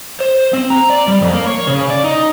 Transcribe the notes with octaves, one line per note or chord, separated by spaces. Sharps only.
C5
C4
A#5
D5
G3
F2
A#3
C#5
C#3
D5
D#4